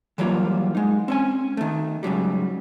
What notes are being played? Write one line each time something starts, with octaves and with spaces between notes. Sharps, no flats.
E3 F#3 G3 A#3 F4
G#3 D#4
C4 C#4 G#5
D#3 A3
G#2 C#3 F#3 G3